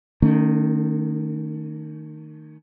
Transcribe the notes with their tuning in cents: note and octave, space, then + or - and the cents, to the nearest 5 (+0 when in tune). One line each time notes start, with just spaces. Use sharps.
D#3 -15 A3 +35 C#4 +20